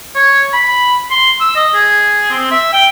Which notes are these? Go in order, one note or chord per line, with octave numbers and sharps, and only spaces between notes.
C#5
B5
C6
E6
D#5
G#4
C4
E5
G5